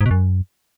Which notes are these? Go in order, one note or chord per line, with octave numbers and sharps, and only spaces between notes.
G#2
B2
F#2